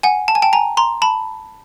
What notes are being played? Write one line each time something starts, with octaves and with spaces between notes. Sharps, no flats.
F#5 G#5
A5
G#5
G5 A5
G#5 A#5
A#5 C6
A5 B5